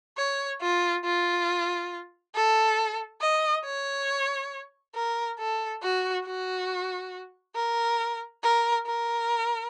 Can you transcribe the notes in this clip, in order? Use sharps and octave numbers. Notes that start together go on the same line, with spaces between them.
C#5
F4
F4
A4
D#5
C#5
A#4
A4
F#4
F#4
A#4
A#4
A#4